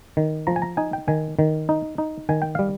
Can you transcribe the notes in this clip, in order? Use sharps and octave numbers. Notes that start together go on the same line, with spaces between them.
D#3
F3 A#5
G#5
A#5
D#4 G#5
G5
D#3 G#5
D#3
D#4
D#4
D#3 G#5
G5
G3 F5